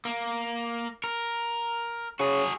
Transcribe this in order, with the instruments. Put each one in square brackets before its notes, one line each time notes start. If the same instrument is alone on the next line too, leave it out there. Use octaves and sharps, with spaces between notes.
[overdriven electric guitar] A#3
A#4
[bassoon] C#3 [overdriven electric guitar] F#4 G#4